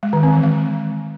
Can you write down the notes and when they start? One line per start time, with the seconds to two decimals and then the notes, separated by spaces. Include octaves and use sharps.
0.03 G#3
0.13 D#3
0.23 C4
0.33 E3
0.43 G#3